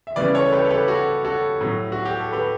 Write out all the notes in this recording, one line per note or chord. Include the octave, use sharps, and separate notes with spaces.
E5
C#3 E3 G3 B4 D5
A4 C#5
G4 B4
A4
G4 B4
F#4 A4
F#4 A4
A2 F#3
F#4
G4
A4
G4 B4